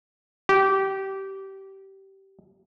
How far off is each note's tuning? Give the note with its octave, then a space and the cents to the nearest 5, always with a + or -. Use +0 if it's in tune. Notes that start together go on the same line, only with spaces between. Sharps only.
G4 -20